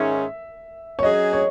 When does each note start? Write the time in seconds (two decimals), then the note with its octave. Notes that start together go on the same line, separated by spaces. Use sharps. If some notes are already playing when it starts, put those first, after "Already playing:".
Already playing: G#2 D#3 G#3 C#4 E5
0.99 C#5
1.03 F#3 C#4 G#4 D#5
1.33 C#5